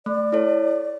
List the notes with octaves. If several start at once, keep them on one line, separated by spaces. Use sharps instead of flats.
A3 D5
E4 A4 C#5